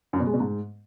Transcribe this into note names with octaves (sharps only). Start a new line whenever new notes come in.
F#2
B2
G#3
B2
G#2